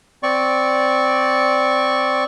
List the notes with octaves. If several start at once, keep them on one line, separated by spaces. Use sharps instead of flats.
C4 D5 C#6